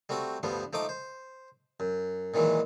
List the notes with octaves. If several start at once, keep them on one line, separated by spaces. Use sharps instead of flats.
G3 A3 C4 F#4
D2 G2 F3 G3 B3
F3 A3 D#4 D6 D#6
C5
F#2
A#2 D#3 E3 F#3 G#3